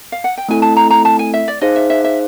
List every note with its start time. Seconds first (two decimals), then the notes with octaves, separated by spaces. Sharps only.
0.12 F5
0.24 F#5
0.38 G5
0.48 A3 C4 E4 A4 G#5
0.62 A5
0.77 A#5
0.90 A#5
1.05 A5
1.19 G#5
1.34 E5
1.48 D5
1.61 D#4 G#4 C5 D#5 F5
1.76 E5
1.90 E5
2.04 E5